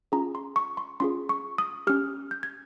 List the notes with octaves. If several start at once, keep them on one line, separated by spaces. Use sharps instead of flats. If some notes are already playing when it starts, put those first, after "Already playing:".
C#4 F4 G#4 A#5
C6
C#6
C6
C#4 F4 G#4 C6
C#6
D#6
C#4 G4 F6
G6
G#6